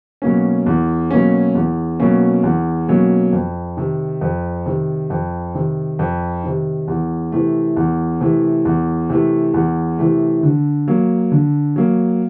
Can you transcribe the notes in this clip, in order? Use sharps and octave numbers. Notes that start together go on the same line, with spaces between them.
B2 F#3 A#3 C#4
E2
B2 F#3 A#3 C#4
E2
B2 F#3 A#3 C#4
E2
B2 F#3 A#3 C#4
F2
C3 D#3
F2
C3 D#3
F2
C3 D#3
F2
C3 D#3
E2
C3 E3 A3
E2
C3 E3 A3
E2
C3 E3 A3
E2
C3 E3 A3
D3
F#3 A#3
D3
F#3 A#3